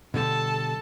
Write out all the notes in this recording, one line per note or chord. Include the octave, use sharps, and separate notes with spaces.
B2 D3 G3 A4 A5